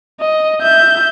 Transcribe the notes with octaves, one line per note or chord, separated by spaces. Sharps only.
D#5
E5 G6